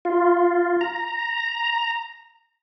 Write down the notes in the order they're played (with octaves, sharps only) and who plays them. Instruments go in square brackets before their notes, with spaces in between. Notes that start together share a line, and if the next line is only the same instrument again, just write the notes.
[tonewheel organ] F4
A#5